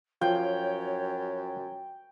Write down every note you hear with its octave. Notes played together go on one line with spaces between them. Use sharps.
F#2 F3 F4 C#5 G5